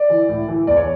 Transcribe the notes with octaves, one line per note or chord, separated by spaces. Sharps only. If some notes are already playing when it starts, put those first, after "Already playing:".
Already playing: D5
E3
A2
E3
E2 D5
C#5